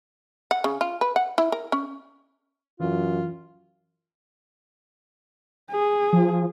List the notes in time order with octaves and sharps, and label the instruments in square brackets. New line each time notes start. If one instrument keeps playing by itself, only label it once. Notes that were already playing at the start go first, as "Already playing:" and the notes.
[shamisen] F#5
C#3
F4
B4
F#5
E4
A#4
C#4
[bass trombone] F#2 [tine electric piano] E3 [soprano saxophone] F4
[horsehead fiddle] G#4
[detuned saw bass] F3